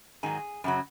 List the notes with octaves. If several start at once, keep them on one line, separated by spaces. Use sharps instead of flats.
G#2 D#3 F#3 G#4
F#2 C#3 F#3